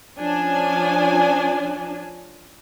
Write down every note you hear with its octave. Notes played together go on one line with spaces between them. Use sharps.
F3 C#4 D4 G#5